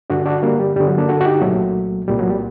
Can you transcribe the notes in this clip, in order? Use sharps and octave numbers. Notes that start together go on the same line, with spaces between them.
G2 D3 D4 F#4
D4 F#4
G3 A#3
G3
G2 D3 G3
F#3
A#3 D4
F#4 A4
F#4
D#4 G4
C2 A#2 F#3 A3
C2 A#2 G3
F#3
G3